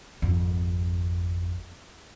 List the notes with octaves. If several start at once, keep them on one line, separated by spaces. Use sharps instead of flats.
G#1 F2